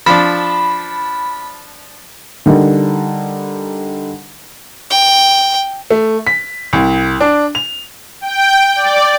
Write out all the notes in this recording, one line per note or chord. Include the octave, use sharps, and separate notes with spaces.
F3 D4 B5
D3 G3 D4 D#4 A#4
G5
A3
B6
C2
D4
F7
G5
D5